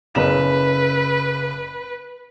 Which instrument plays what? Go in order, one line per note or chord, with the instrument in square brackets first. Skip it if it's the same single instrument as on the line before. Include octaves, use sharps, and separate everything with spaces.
[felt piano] F#1 C#3 E7 [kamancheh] B4